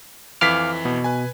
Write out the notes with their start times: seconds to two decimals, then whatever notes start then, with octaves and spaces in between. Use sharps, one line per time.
0.41 F2 E3 F5 D6 F6 B6
0.85 B2
1.04 B4 G#5